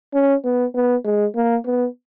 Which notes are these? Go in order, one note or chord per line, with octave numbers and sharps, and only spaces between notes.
C#4
B3
B3
G#3
A#3
B3